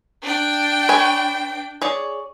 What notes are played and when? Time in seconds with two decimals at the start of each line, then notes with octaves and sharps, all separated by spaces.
0.23 D4 G5
0.89 B4 C#5 G#5
1.82 G#4 C#5 D5